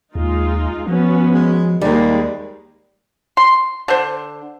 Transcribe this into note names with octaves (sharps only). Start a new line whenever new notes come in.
D#2 G#3 D#4 F4
F3 B3 C#4 F#4
G#3
D#2 G3 G#3 A#3
C6
D3 C5